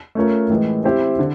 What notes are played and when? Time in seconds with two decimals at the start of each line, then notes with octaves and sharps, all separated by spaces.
0.15 A3 C#4 F4 A#4 C#5
0.50 A2 E3 G#3
0.84 C4 E4 G4 C5 E5
1.19 D3